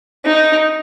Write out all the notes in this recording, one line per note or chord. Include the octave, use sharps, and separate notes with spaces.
D#4